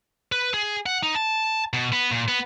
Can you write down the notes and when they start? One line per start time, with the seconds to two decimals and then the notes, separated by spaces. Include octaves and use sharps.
0.32 B4
0.54 G#4
0.86 F#5
1.03 D#4
1.15 A5
1.73 B2
1.92 B3
2.11 A#2
2.28 B3